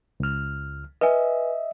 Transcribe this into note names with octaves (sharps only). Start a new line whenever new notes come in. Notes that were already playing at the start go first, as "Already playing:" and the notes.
C#2 F6
B4 D#5 E5 G#5